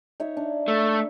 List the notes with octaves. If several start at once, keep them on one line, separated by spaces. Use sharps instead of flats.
D#4 C#5 E5
D4
A3